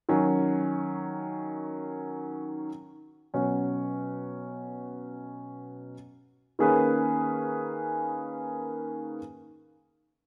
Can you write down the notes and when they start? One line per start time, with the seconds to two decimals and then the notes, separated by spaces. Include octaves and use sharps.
0.09 D#3 F#3 C#4
3.34 B2 F#3 C#4 F#4 C#5
6.59 D#3 A#3 C#4 G#4 B4